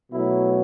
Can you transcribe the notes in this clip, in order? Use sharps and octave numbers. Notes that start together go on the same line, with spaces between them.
B2 F#3 A3 E4